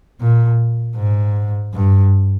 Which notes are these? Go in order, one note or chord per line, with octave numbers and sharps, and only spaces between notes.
A#2
G#2
G2